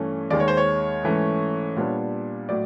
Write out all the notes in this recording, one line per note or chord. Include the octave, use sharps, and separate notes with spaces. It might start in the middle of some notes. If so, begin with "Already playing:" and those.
Already playing: G2 E3 A3 C#4
D#2 D#3 G#3 D5
C#5
C5
C#5
G#2 E3 A3 C#4
A#2 G3 B3 D4
A2 F#3 D5